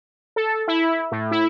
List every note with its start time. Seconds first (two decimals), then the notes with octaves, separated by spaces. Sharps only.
0.36 A4
0.68 E4
1.12 A2
1.31 E4